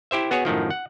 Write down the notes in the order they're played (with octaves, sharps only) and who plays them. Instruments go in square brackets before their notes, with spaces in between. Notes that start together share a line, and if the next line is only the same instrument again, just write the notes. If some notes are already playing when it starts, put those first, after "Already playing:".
[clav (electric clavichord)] E4 G4 C5 E5
B3 F#4 G#4 C#5
F#2 A2 D#3 F3
F#5